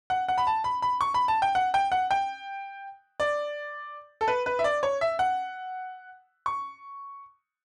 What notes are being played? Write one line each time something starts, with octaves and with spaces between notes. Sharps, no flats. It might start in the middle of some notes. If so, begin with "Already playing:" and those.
F#5
F#5
B5
A5
B5
B5
C#6
B5
A5
G5
F#5
G5
F#5
G5
D5
A4
B4
B4
E5
D5
C#5
E5
F#5
C#6